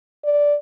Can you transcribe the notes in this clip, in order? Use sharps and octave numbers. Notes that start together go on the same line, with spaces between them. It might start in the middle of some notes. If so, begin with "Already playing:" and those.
D5